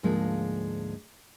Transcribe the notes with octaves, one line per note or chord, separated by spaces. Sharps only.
D2 G#2 F3 G#3 A#3